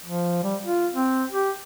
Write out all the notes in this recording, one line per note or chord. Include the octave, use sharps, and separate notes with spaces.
F3
G3
F4
C4
G4